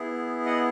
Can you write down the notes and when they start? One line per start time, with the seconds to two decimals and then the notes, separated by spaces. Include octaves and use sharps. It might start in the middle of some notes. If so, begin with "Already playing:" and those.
Already playing: B3 E4 G#4
0.46 D#5 F#5